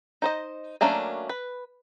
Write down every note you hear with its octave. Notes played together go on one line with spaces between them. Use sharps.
D#4 C5 D#5
F#3 A3 A#3 C#4 D4
B4